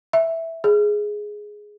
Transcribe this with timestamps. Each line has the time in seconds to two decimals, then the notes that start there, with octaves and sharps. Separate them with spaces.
0.13 E5
0.64 G#4